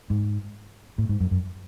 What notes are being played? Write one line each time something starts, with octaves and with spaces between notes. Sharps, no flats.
G#2
A2
G#2
F#2
F#2